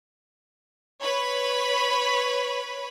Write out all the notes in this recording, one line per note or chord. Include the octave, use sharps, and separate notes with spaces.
B4 C#5 B5